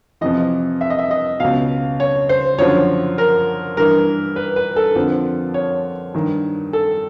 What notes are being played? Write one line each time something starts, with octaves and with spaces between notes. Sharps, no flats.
F2 C3 E3 D#5
E5
D#5
E5
D#5
C#2 B2 F5
C#5
C5
F#2 D3 F3 C#5
A#4
G2 E3 A#4
B4
B4
A4
F2 D3 F3
C#5
G2 D#3
A4